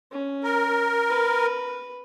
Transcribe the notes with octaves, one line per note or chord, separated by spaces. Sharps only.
C#4
A#4
B4